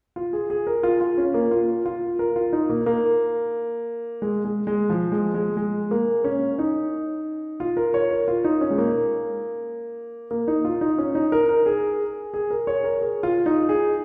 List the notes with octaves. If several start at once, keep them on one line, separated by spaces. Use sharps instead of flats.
F4
G#4
G#4
A#4
F4
F4
C#4
A#3
F4
F4
A#4
F4
D#4
A#3
A#3
G#3
G#3
G#3
F3
G#3
G#3
G#3
A#3
C#4
D#4
F4
A#4
C#5
A#4
F4
D#4
C#4
G#3
A#3
A#3
D#4
F4
D#4
C#4
D#4
A#4
A#4
G#4
G#4
A#4
C#5
A#4
G#4
F4
D#4
G#4